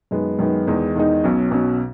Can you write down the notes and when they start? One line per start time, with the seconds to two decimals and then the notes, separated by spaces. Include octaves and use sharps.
0.11 F#2 D#3 G#3 B3
0.39 F#2 D#3 G#3 B3
0.67 E2 D#3 G#3 D#4
0.95 E2 D#3 G#3 D#4
1.24 B1 B2 F#3 C#4
1.51 B1 B2 F#3 C#4